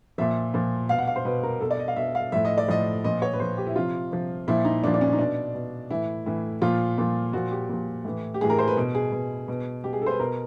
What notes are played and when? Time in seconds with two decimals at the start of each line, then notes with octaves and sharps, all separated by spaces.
0.18 A#2 F3 E5
0.54 A#2 F3
0.89 B2 F5
0.98 F#5
1.07 F5
1.16 C5
1.25 B2 B4
1.43 A#4
1.61 B2 A4
1.71 D5
1.79 D#5
1.88 F5
1.96 B2 E5
2.15 F5
2.32 A2 F3 E5
2.45 D#5
2.58 D5
2.68 A2 F3 D#5
3.04 A#2 F3 D#5
3.22 C#5
3.33 B4
3.40 A#2 F3 C5
3.57 G4
3.67 E4
3.76 C3 F3 F4
4.11 C3 F3
4.48 A#2 F3 E4
4.65 D#4
4.84 A#2 D4
4.87 F3
4.94 D4
5.01 C#4
5.13 D#4
5.19 B2 D4
5.55 B2
5.91 A2 E3 E4
6.26 A2 E3
6.62 A#2 F3 F4
6.98 A#2 F3
7.33 A#2 F3 F#4
7.51 G4
7.69 A#2 F3
8.05 A2 E3
8.34 G4
8.41 A2 E3 G#4
8.50 A#4
8.59 C5
8.68 B4
8.77 B2
8.95 G#4
9.12 B2
9.48 B2
9.84 B2 G4
9.93 G#4
10.02 A4
10.07 C5
10.10 B4
10.19 B2 A#4